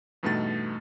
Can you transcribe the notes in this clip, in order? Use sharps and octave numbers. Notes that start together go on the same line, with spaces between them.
E2 G2 B2 A3 D#4 A6